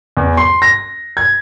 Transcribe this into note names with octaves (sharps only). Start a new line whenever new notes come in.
E2
C6
A#6
G#6